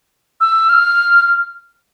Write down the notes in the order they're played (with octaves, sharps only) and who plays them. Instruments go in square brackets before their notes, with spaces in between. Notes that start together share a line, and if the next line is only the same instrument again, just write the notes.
[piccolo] E6
F6